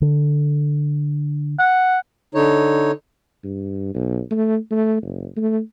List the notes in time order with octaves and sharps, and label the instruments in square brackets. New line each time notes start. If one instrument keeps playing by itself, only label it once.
[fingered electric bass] D3
[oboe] F#5
[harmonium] D3 D#4 C#5
[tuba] G2
B1
A3
A3
F#1
A3